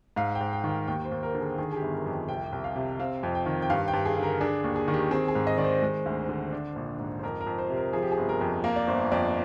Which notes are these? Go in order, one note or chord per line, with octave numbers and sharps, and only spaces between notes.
G#2 F5
G5
G#2
G5
D#3
G5
D#2 G5
C5
D#2
A#4
D3
G#4
D#3 G#4
G#4
G4
G1
A#4
F2
C2 G5
C2
F5
C3
C4 F5
F2
G5
D#3
G5
G2 F5
G5
G2
G#4
D3
A#4
D4 G#4
D#2
G#4
D#3
G4
C4 G#4
G#4
G#2
D#5
D#3 D5
C5
G#3
D2
D3
D4
A#1
G#2
C5
F2 A#4
A#4
F2
C5
C3
A#4
F3 G#4
G4
G#4
G1
A#4
F2
A#3 A#4
D5
G1 C5
F2 D5